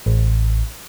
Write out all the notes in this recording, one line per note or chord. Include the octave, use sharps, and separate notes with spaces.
A1